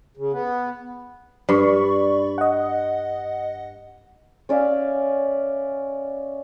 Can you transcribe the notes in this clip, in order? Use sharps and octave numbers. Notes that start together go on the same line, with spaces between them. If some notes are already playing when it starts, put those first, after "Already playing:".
C#3
B3
G2 D5 B5 C#6
D#5 F#5
C#4 D5 E5 F5